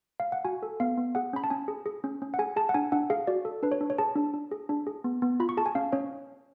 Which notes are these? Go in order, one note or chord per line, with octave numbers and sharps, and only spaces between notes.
F5
F#5
F#4 G#5
A4
B3 F5
B3
G#4 F#5
C#4 B5
A5
C#4 G#5
G#4
G#4
C#4
C#4
F#5
G#4 G#5
G#4 A5
F#5
D4 G#5
D4 F#5
G#4 F5
F#4 D5
A4
D4 B4
C#5
D4
C#5
G#4 A5
D4
D4
G#4
D4
G#4
B3
B3
F4 B5
C#6
G#4 A5
G#5
C#4 F5
C#4 C#5